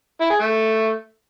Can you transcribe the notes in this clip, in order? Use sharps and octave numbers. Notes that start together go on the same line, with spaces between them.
E4
G#4
A3